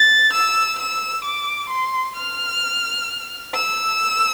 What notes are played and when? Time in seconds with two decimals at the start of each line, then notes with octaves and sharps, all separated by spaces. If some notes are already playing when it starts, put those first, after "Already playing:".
Already playing: A6
0.33 E6
0.79 E6
1.25 D6
1.70 C6
2.17 F6
3.54 E6